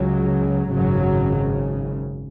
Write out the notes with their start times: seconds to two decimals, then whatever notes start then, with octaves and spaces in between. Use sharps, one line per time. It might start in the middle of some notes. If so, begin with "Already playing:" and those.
Already playing: C#2 C#3 F#3
0.71 G#1 F#2 C#3 F#3